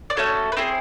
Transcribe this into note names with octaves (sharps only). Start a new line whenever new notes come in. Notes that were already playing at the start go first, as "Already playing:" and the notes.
D5
A3 C#4 F#4 A4 C#5
B4
C4 E4 G#4 C5